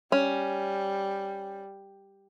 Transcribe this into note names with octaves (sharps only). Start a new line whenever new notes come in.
G3 C#4